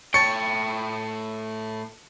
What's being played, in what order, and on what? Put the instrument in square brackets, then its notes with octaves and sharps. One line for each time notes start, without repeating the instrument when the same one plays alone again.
[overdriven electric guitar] A2 G5 [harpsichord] C#5 A5 [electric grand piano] C#7